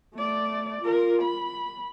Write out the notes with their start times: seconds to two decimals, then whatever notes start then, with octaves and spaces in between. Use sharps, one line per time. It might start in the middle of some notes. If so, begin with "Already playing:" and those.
0.14 A3 D5
0.81 F4 A#4
1.22 B5